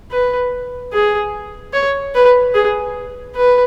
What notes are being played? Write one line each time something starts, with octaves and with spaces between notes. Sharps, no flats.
B4
G#4
C#5
B4
G#4
B4